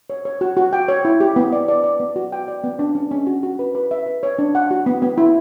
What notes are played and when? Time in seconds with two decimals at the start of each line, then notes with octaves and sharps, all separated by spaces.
0.10 C#5
0.25 C#5
0.41 F#4
0.57 F#4
0.73 G5
0.88 C#5
1.05 E4
1.20 G4
1.36 B3
1.53 D5
1.68 D5
1.84 D5
2.00 B3
2.16 F#4
2.32 G5
2.48 D5
2.64 B3
2.79 D4
2.95 C#4
3.11 C#4
3.27 F#4
3.43 F#4
3.59 B4
3.75 B4
3.91 E5
4.06 B4
4.23 C#5
4.39 D4
4.55 F#5
4.71 F#4
4.86 B3
5.02 B3
5.18 E4